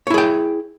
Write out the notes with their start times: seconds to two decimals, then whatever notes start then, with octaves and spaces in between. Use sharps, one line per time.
0.07 C#5
0.10 E4
0.14 G#4
0.18 G5